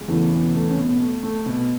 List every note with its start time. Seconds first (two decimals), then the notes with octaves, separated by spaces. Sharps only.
0.01 G#3
0.08 E2 C#3 E3 A3
0.31 B2 B3
0.54 A3
0.71 C#4
0.77 B2 B3
1.00 A3
1.23 A3
1.46 B2 B3